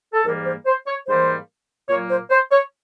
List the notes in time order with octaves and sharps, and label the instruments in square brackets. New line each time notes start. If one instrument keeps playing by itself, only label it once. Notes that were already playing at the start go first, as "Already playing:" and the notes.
[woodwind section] A4
G#2 E3 G3 A#3 A#4
C5
C5
C#5
G#2 E3 G3 A#3 C5
A#2 F#3 A#3 C#5
C5
C5
C#5